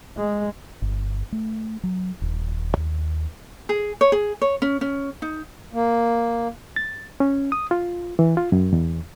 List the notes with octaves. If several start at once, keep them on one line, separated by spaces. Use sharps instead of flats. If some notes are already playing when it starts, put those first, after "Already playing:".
G#3
G1
A3
F#3
D#1
D#2
G#4
C#5
G#4
C#5
C#4
C#4
D#4
A#3
A6
C#4
D#6
F4
E3
F4
F#2
E2